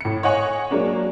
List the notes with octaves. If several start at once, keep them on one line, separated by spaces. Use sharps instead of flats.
A2 C#7
C#5 D#5 F#5 G#5 C#6
F#3 G#3 A#3 D4